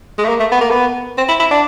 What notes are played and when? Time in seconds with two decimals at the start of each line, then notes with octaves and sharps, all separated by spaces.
0.18 G#3
0.24 A3
0.29 A#3
0.40 A3
0.52 B3
0.61 A#3
0.71 B3
1.18 C4
1.29 E4
1.40 E4
1.51 D4